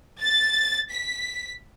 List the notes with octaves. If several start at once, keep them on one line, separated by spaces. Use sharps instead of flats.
A6
B6